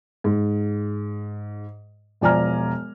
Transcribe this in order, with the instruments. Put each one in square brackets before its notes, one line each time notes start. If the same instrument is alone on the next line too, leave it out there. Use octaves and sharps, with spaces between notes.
[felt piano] G#2
E1 F3 D5 G#5 A#5 F6